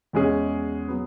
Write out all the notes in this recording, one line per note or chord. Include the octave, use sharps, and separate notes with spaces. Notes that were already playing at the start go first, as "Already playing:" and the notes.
E2 B2 G#3 C#4 G#4
F#3 B3